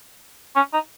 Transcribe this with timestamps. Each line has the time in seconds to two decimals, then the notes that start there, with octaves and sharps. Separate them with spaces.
0.56 C#4
0.73 D#4